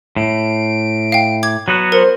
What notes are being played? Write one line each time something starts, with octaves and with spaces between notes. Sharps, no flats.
A2 D7
F5 G5
D6 G#6
F#3 B3 F#4
A#4 C5